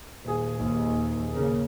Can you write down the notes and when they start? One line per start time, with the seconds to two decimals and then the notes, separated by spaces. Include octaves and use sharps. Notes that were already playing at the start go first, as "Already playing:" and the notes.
0.25 D#1 G#4
0.58 D#2
1.31 C#3 A#3